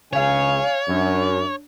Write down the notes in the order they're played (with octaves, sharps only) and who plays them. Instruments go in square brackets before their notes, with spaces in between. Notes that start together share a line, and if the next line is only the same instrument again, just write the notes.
[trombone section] C#2 C#3 [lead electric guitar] C#5 [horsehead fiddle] F5 G#5
[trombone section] F#2 [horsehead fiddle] D4